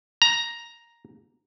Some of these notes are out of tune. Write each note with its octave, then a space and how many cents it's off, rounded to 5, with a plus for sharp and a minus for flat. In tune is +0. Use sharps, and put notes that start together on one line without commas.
A#5 +5